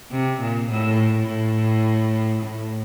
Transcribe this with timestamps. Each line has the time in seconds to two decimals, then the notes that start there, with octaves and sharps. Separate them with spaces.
0.11 C3
0.40 A#2
0.70 A2
1.27 A2
2.43 A2